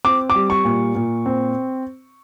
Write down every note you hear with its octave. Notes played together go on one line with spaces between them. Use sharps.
C4 D6
D6
G3
C#6
A#2
A#2
C4